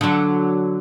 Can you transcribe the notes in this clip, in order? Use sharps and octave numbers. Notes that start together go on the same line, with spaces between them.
D3 F#3